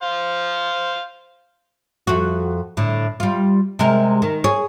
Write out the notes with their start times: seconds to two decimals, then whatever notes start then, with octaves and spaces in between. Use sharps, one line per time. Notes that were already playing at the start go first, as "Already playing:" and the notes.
0.03 C5 F5
2.07 F2 F#4
2.77 A2 D3
3.20 G3 F4
3.79 C3 G#3 A#4
4.22 D#3
4.44 G#4 C#5